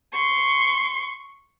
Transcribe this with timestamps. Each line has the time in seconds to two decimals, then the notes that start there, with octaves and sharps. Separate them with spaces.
0.13 C6 C#6